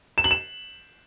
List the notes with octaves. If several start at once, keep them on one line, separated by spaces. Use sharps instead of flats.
E7
F#7
E7